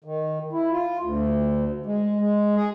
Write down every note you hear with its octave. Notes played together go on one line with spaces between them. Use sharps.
D#3
E4
F4
D2
G#3
G#3
G#4